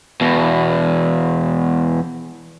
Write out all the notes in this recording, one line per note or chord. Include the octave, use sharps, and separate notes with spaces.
E2 B2